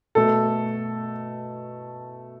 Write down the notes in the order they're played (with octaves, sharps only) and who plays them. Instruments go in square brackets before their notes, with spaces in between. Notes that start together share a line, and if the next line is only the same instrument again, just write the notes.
[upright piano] B2 A3 A4